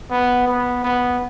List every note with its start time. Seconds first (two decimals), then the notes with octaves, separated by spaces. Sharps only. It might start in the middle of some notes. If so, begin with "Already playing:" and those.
0.11 B3
0.47 B3
0.84 B3